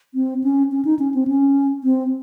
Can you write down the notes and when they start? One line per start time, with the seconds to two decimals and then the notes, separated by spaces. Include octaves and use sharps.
0.14 C4
0.44 C#4
0.72 C#4
0.85 D#4
0.99 C#4
1.14 C4
1.27 C#4
1.84 C4